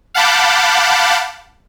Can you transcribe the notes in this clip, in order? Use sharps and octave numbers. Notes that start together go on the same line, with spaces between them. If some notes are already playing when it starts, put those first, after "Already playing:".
F5 F#5 A5 B5 D6 G6